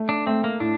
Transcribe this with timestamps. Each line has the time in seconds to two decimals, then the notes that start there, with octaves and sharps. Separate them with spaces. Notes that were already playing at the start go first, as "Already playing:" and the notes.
Already playing: A3
0.09 D4
0.26 A3 C4
0.44 A#3
0.60 A2 D4